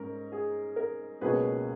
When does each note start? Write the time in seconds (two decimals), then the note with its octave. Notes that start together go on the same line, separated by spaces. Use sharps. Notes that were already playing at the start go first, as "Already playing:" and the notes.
Already playing: G#2 C#4 A#4
0.32 G#4
0.76 A#4
1.21 C#2 B2 F#3 A#3 C#4 G#4 B4